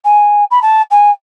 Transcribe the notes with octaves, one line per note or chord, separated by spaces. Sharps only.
G#5
B5
A5
G#5